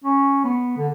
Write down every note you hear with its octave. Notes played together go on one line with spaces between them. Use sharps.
C#4
B3
D3